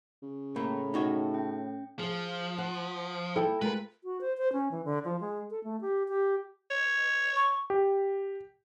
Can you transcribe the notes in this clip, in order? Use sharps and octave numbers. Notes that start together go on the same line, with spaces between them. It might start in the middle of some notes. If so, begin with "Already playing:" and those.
C#3
A2 A3 A#3 A#5 B5
D#4 F#4 C#5
C#4 G5
F3 G#4 F5
F#5
E4 A4 G5
G#3 F4 A#4 B4
F#4
C5
C5
C#4
E3
D3
F3
G#3
A4
A3
G4
G4
C#5
C#6
G4